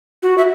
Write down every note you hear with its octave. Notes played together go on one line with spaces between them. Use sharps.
F#4
E5